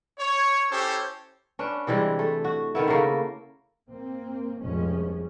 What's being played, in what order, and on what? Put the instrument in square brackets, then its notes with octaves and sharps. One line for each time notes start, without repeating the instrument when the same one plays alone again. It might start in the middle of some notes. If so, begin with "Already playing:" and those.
[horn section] C#5
C#4 E4 G4 A4 C5 C#5
[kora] C#4 D4 B4
C3 E3 G3 G#3
A3
F#4
D#3 A3 B3 E4
C#3 A3 A#3
[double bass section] A#3 C4
F1 F3 G3 G#3 C#4